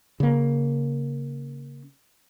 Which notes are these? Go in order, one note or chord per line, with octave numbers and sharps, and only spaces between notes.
C#3 A#3